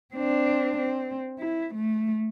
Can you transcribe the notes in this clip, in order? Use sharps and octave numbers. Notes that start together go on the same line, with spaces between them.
C4 D4
C4
E4
A3